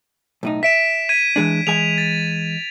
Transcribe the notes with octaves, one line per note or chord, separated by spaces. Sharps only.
B1 A2 D#4
E5 B6 D7 E7
G#6 B6 D#7
E3 G#3 D4
E3 G#3 G#5 F7
A6